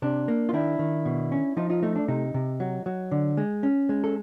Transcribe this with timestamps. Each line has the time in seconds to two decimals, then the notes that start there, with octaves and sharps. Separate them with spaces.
0.02 C3 D4
0.28 A#3
0.49 F4
0.54 D#3 D4 E4
0.79 D#3
1.05 B2
1.32 C#4
1.57 F3 D#4 F4
1.70 D#4 F4
1.83 A3 D#4
1.96 D4
2.08 C3 D#4
2.34 C3
2.60 F#3
2.86 F#3
3.12 D3
3.37 G#3
3.63 C#4
3.89 G#3
4.04 A4